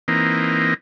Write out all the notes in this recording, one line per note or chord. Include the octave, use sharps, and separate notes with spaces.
E3 A#3 C4 D#4